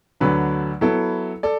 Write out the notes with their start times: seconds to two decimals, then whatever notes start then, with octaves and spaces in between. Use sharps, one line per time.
0.20 D2 D3 F#3 D4 B4
0.81 F#3 B3 E4 A4
1.43 A4 D5